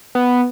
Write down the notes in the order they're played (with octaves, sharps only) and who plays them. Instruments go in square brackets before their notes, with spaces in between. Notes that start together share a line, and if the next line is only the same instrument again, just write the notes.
[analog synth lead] B3